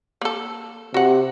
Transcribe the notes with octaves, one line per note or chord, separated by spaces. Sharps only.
A#3 A4
C3 F#4 F#5